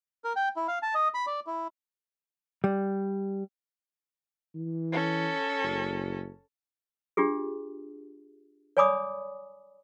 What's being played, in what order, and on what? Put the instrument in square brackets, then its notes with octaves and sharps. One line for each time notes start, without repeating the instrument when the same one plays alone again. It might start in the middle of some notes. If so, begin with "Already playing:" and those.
[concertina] A#4
G5
E4
F5
A5
D#5
B5
D5
E4
[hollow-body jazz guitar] G3
[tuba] E3
[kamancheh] C#4 A4
[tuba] F#1
[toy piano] D4 F4 G4 G#4
C#5 D5 G#5 B5 D6 D#6